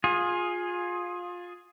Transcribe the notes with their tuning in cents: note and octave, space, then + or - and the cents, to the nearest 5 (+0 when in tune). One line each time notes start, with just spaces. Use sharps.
F4 +20 G#4 +0